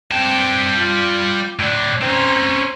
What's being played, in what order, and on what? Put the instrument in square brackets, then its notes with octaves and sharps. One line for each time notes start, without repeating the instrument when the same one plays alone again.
[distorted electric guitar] G3 A5 [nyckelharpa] C4 G5
[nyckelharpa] F4
[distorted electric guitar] A2 D4 [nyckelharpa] D5
[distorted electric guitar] C4 C#4 [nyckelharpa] C5 A#5